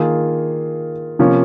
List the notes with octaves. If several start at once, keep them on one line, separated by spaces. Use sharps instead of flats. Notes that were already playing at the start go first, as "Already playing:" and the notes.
Already playing: D#3 A#3 F4 G#4
C3 F3 A#3 C#4